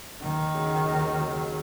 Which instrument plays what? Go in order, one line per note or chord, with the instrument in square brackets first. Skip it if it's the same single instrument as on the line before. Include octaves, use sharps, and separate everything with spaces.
[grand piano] D#2 [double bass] D#3
[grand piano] C#3 F#3
D#2
C#3 F#3